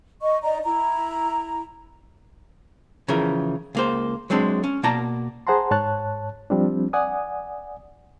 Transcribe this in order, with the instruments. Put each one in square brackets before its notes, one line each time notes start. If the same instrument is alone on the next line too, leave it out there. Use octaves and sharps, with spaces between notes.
[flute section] D#5 C#6
D#4 D5 D#5 A#5
E4 A#5
[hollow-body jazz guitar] C#3 E3 F3 A#4
C#2 A#3 C5
F#3 G#3 C4 D4
C#4
B2 A#3 D5 A5 A#5
[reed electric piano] G#4 C5 F#5 A5 A#5 C6
G#2 C#5 A5 F#6
F3 G3 C4 D4
D5 F#5 G#5 D#6